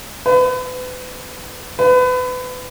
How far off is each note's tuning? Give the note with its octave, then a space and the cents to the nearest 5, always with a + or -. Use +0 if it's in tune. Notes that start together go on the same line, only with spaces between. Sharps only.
B4 +35
B4 +30